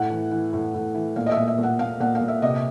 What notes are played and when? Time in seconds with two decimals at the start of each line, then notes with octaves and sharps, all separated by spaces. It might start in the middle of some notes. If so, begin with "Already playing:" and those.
Already playing: A2 F#5
0.10 E3
0.32 E3
0.53 A2
0.74 A2
0.95 E3
1.16 A#2 F5
1.26 D#5
1.32 E5
1.37 A#2
1.48 E5
1.58 A#2 F#5
1.79 A#2 F5
2.00 A#2 F#5
2.15 F5
2.21 A#2
2.28 E5
2.42 C3 D#5